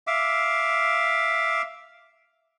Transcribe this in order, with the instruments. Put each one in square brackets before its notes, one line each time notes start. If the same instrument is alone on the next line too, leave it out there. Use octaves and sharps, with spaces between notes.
[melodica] E5 F5 D6